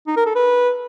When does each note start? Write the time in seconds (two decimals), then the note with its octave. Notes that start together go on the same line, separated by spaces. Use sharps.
0.07 D#4
0.16 A#4
0.26 A4
0.35 B4